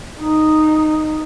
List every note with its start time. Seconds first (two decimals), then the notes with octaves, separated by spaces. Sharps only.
0.19 D#4